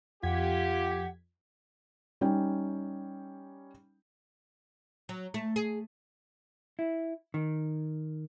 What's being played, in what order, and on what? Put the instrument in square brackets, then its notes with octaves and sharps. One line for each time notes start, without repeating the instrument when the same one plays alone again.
[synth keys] F2 G#6 B6 [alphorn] F4 [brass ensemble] G4 [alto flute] F#5
[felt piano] G3 C#4 D#4 G5
[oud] F#3
A3
G#4
[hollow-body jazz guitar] E4
D#3